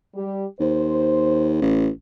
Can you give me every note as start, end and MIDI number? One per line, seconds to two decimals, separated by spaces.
0.14 0.46 55
0.14 0.46 67
0.60 1.57 39
0.60 1.61 72
1.62 1.89 33